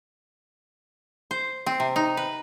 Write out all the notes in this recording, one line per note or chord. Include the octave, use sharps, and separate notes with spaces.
C5
C4
C3
D#4
B4